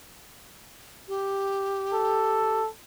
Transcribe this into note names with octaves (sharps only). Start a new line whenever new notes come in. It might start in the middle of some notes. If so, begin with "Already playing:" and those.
G4
A4